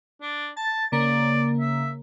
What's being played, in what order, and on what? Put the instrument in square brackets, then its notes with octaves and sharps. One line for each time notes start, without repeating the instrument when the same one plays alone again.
[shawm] D4
[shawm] A5 [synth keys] A6
[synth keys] C#3 A#3 [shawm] D5
[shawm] E5